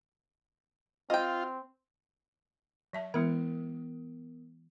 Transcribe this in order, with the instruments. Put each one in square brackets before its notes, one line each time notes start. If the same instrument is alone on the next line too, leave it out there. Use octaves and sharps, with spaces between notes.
[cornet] C4 [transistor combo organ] F4 [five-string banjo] D#5 G5
[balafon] F#3 E5 A5
[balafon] E3 G#3 E4 [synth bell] B3 A#4